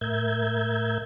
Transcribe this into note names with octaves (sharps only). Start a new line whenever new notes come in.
A2 A#4 E5 G6 G#6